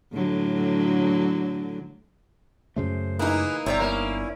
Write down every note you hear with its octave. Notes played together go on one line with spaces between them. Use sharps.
A2 D3 F#3
F#2 C#3 A3 C5
E3 A#3 D#4 E4 G#4 B4
G1 C3 C#5 D5 G5 A#5
A#3 C#4 E4